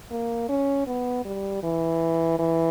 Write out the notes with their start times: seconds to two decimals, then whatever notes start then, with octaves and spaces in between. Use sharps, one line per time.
0.11 A#3
0.49 C#4
0.87 B3
1.25 G3
1.63 E3
2.39 E3